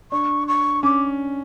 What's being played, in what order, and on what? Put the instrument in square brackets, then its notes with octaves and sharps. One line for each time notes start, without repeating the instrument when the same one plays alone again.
[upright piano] D4 [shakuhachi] C#6
[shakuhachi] C#6
[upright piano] C#4 [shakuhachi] D6